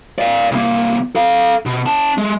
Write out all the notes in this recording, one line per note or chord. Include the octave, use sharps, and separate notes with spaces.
D5 F5
C2 A#3
A4 F5
B2
C#4 A5
G#3